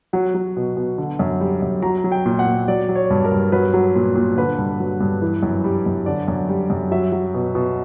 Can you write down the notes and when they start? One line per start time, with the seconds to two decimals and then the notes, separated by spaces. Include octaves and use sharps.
0.13 F#3 F#5
0.34 F#3
0.56 B2
0.76 B2
0.98 D3
1.19 F#2
1.41 G3
1.62 F#2
1.83 F#3 A#5
2.04 F#3
2.12 G5
2.26 A#2
2.39 F#5
2.46 A#2
2.68 F#3 D5
2.89 F#3
2.95 C#5
3.10 G2
3.24 A#4
3.32 G2
3.52 F#3 B4
3.74 F#3
3.95 A#2
4.16 A#2
4.37 D3 B4
4.58 G2
4.80 F#3
5.00 G2
5.22 E3
5.43 F#2
5.64 G3
5.86 F#2
6.06 D3 D5
6.28 F#2
6.49 G3
6.70 F#2
6.91 F#3 E5
7.12 F#3
7.34 B2
7.55 B2